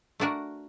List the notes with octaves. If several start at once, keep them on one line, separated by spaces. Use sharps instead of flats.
A3 D4 F#4 A#4